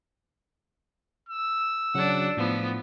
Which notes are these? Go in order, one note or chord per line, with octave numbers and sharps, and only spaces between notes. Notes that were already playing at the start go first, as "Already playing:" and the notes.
E6
C#3 F#3 D4 F#4 F#5
A2 F3 B3